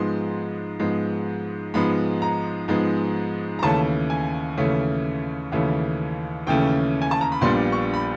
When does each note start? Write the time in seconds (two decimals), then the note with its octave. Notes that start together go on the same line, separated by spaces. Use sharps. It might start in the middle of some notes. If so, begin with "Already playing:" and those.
Already playing: G#2 F3 G#3 B3 C6
0.80 G#2 F3 G#3 B3
1.74 G#2 F3 G#3 B3 B5
2.22 A#5
2.68 G#2 F3 G#3 B3
3.59 A#5
3.63 D#2 C#3 E3 A3 C#4 A5
4.10 G#5
4.57 D#2 C#3 E3 A3 C#4
5.52 D#2 C#3 E3 A3 C#4
6.47 D#2 C#3 E3 A3 C#4 G5
7.02 G#5
7.11 A5
7.21 A#5
7.32 B5
7.41 A#1 A#2 G3 B3 D4 C6
7.72 C#6
7.93 B5